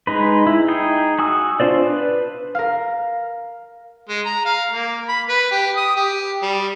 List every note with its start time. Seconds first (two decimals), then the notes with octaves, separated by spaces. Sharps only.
0.07 G#3 D#4 B4
0.47 E4
0.68 D#4 G#4 G5
1.18 F#4 G#5 D#6 E6
1.60 D4 D#4 F4 C5 D5
1.84 B4
2.55 A#4 F5
4.09 G#3
4.25 A#5
4.45 F5
4.71 A#3
5.08 B5
5.29 B4
5.51 G4
5.76 D#6
5.96 G4
6.43 G3